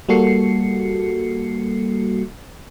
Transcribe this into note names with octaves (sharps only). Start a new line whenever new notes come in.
G3 A#3 F#4 A4 C7 C#7